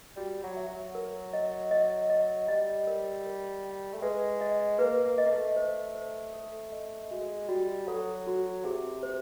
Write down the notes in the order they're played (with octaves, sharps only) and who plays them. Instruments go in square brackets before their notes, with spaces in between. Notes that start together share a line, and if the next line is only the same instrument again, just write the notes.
[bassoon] G3 [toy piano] F#4
[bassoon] F#3
[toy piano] E5
[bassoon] F#3
[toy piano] A#4
D#5
D#5
D#5
[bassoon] G3 [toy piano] D#5
[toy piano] A#4
A#4
G5
[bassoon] A3
[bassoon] G#3 [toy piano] B4
[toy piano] D#5
[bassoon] A#3 [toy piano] B4
[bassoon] A#3
[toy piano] D#5
[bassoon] A#3
A3
[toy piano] C5
C5
A4
D#5
[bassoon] G#3 [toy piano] F#4
[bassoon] G3 [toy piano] F#4
[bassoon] F#3 [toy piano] A4
[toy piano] F#4
[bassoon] C3 [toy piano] G#4
[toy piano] C5